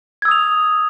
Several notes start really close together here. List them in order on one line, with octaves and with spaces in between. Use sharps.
G#6 E6 D#6 F7